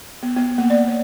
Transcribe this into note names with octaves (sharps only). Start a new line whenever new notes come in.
B3
B3
A#3
D5
C#5